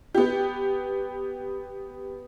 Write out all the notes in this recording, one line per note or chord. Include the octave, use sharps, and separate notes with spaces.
B3 G4